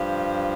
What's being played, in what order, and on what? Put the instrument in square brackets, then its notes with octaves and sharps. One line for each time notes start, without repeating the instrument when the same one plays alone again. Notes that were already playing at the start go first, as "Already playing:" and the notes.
Already playing: [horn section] G2 F3